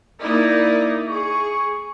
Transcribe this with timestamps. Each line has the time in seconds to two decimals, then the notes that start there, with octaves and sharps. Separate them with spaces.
0.23 A#3 D#4 E4 D5
1.08 G#4 C#6